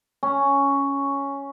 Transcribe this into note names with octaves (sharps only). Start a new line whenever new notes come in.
C#4